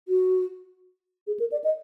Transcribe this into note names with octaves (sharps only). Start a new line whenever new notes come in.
F#4
G#4
A#4
D5
D#5